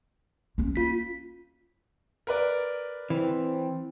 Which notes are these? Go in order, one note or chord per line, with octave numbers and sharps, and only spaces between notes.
A#3 C#4
F4 B6
A#4 B4 D5
E3 C4